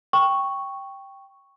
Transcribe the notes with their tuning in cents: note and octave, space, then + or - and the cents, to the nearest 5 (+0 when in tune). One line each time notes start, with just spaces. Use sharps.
G5 +0 C#6 +0